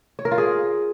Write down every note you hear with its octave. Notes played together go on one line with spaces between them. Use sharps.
C#5
A#4
F4
G#4